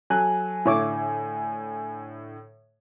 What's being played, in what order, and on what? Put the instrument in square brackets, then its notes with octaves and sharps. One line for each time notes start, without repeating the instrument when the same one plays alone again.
[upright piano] F#3 A4 F#6 [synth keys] G#5
[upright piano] A2 D3 [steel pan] E4 C#5 D6